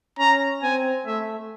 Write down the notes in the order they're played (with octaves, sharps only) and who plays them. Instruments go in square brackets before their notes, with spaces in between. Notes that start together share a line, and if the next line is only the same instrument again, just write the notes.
[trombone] C#4 [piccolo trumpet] A#5
[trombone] C4 [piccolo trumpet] G#5
[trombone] A3 [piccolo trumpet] E5